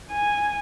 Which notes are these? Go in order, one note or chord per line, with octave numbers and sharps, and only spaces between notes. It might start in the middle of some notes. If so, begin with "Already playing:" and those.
G#5